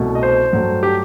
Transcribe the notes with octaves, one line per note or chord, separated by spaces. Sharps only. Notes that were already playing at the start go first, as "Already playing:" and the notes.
Already playing: C2 B2 A3
D#5
C5
G2 F#3 A3
G4